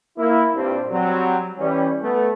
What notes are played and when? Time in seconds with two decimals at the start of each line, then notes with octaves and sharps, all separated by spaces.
0.18 A#3 E4
0.55 G2 A#2 G3 C4
0.91 F#3 G3 C4
1.58 E3 G3 C#4
2.02 A3 B3